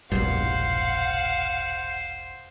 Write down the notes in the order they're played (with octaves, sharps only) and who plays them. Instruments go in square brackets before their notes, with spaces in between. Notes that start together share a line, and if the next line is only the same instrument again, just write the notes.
[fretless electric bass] E1 A#1 G2 [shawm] C5 [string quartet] F5 F#5